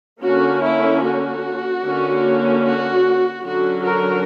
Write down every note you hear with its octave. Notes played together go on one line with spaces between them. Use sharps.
D3 A#3 C#4 F#4
E4
F#4
D3 A#3 C#4
F#4
D3 F#3 C#4 F#4
F#4 A#4